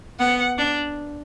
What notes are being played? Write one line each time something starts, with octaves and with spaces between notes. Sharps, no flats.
B3 F#5
D4